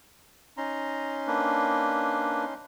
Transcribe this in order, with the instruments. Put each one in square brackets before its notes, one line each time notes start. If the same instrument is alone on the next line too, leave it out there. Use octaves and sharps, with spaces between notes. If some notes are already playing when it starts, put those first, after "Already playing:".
[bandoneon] C#4 D#4 C6 [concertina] A#5
[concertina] A#3 D4 B4